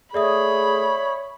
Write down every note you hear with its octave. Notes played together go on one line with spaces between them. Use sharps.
A3 G#4 C#5 D5 E5 B5 D#6